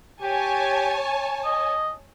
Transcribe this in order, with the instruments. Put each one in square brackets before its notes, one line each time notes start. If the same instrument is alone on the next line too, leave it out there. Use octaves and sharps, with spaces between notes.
[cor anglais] G4 [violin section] C#5 G#5 A5
[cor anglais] D#5